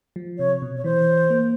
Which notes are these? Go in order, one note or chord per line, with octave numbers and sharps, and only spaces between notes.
F3
C3 C#5
B2
C#5
E3 C5
A#3